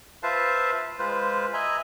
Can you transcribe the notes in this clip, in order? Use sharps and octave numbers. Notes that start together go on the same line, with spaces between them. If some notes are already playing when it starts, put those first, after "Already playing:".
F4 B4 C5 E5 F5 A5
G#3 F4 B4 C5
D#5 E5 G#5 A#5 B5